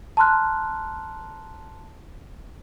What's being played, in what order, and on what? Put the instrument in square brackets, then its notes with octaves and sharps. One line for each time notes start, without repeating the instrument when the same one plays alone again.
[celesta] A5 A#5 C6 F6 F#6